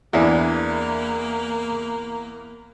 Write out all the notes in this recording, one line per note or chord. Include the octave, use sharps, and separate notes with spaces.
E2 E3 A#3 D4 G#4 E5